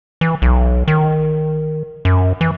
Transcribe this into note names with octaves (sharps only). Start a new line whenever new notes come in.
E3
B1
D#3
F#2
E3